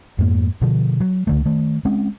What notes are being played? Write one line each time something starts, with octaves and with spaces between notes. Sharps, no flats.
F2 G#2 G#3 A#3
B2 D3 F3
F#3
C#2 D3 A3
D#3 A3
G#3 C4 C#4